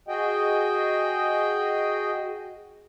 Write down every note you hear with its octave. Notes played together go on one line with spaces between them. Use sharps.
F#4 G#4 D#5 G5